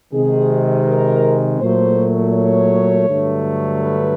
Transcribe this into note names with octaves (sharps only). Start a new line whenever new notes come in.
C3 D#3 G#3 G#4
A#4
A#2 F#3 A3 C5
C#5
G2 D3 F#3 A3
B4